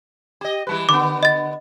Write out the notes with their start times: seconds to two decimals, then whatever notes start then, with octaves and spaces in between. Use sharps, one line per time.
0.41 G4 D#5
0.67 E3 G3 B4
0.89 D3 B3 D6
1.23 D#5 A6